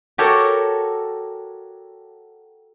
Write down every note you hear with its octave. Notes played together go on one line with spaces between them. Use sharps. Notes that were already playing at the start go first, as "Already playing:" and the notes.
F#4 G4 A4 A#4 C#5